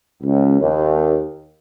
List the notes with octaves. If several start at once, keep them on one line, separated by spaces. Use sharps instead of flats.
C#2
D#2